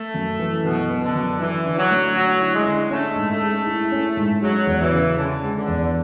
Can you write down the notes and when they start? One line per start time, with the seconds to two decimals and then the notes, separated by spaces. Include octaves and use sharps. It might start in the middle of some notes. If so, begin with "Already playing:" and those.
Already playing: A3
0.14 F#2
0.39 E3
0.65 F#2 B2
0.90 B3
1.02 D3
1.15 F#2
1.39 E3 E4
1.66 D3
1.78 F#3
1.90 A3
2.16 D3 F#3
2.40 E4
2.54 G#3
2.66 D3
2.90 A3 C#4
3.16 G#2
3.29 A3
3.42 G#3
3.66 E4
3.91 C#4
4.17 G#2
4.42 F#3 G#3
4.67 E2
4.80 E3
4.92 C#3
5.17 D3 C#4
5.42 G#3
5.55 D3
5.68 E2